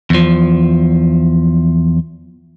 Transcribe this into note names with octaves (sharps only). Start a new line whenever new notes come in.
E2 F3